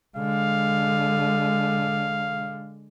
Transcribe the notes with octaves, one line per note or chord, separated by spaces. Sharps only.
D3 G#3 F5